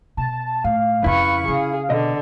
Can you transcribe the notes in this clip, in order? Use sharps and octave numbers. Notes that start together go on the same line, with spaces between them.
B2 A5
A2 F5
F2 C#3 E4 B4 C#6
C#3 G#4
B2 D3 D#5